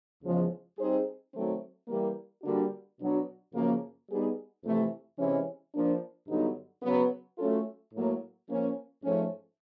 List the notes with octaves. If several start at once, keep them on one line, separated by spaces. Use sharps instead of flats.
E2 C#3 F3 G#3
G3 C4 D#4 G#4 C5
D#3 F#3 A3 C4
E3 G3 A#3
D3 G3 A#3 D4 F#4
B2 F#3 B3 D4 F#4
F#2 C#3 F3 A#3
G3 B3 D#4 G#4
F2 C3 E3 A3
C3 E3 G#3 C#4
F3 A#3 D4
G2 D3 F#3 B3 D#4
C#3 F#3 B3
F#3 A3 C#4 F4 A4
A2 F#3 A#3
F3 A#3 C#4
G#2 F3 A3 C#4